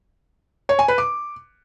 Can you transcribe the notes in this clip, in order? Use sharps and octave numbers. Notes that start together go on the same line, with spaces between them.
C#5
G#5
B4
D6